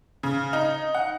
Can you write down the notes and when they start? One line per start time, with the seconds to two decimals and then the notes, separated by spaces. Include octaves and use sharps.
0.23 C#3
0.53 D#4
0.95 F#5